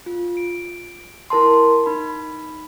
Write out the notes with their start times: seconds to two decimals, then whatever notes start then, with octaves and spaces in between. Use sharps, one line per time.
0.06 F4
0.37 D7
1.30 E4 A#4 A5 C6
1.86 D#4 B5